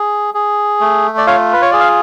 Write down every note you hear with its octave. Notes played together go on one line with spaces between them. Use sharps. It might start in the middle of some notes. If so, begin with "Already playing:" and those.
Already playing: G#4
G#4
A3
D5
F4 C#5 F5
B4
C#5
G#4 D5
F5